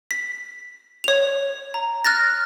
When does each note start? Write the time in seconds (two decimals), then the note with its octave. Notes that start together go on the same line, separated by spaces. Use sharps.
0.11 B6
1.04 C#5 F7
1.74 A#5
2.05 F6 F#6 A6 A#6